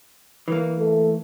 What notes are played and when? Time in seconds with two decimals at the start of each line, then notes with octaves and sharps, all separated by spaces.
0.48 E3 A#3
0.78 A3